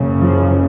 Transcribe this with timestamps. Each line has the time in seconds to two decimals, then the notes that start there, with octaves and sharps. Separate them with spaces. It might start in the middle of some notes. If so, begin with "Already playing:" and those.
Already playing: F#1 F#2 C#3
0.21 F3